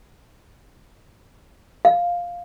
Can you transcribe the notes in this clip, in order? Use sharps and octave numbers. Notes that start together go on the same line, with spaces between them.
F5